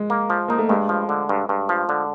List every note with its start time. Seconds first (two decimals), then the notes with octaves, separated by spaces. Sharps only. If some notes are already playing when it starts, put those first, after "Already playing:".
Already playing: G#3
0.10 A#3
0.30 F3
0.48 A#3 D#4
0.59 A3
0.69 G2 G#3
0.89 F3
1.09 D3
1.29 G2
1.49 G2
1.69 F3
1.89 D3